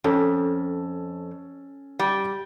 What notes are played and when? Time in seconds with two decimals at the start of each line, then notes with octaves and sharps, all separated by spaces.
0.04 F2 C#4 A4
1.99 G3